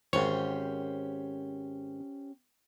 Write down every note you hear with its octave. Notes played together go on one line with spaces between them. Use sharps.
G#1 C#4 G4 C5 C#5